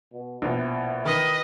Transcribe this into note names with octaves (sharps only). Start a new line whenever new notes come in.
B2
A#1 B2 B3 E4
D#3 B4 D#5